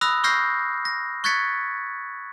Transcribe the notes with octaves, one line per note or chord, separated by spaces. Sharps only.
B5 D#6 E6 F#6 A#6
C#6 E6 F6 G6 A#6 C7
A#6
C#6 F#6 G#6 A6 B6 C#7